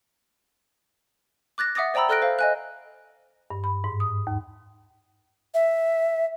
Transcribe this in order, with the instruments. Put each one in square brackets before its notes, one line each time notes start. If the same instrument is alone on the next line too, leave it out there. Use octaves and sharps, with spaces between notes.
[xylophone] D6 F#6 A6 A#6
E5 F#5 D6 D#6 A6 A#6
C5 D5 G5 A#5 B5 E6
A4 D5 F6 F#6 A#6 D7
C5 F5
D#5 G#5 F#6
[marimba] G2
B5
G#2
D#6
D#2
[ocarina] E5